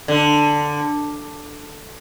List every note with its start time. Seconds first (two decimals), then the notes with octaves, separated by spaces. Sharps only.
0.08 D3